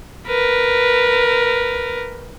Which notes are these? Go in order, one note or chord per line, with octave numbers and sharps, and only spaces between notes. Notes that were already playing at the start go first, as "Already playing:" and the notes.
A#4 B4